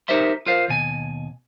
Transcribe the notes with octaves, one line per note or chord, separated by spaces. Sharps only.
D#4 G4 A#4 C5 E5 C6
F4 A#4 C5 F5
D#2 B2 G#5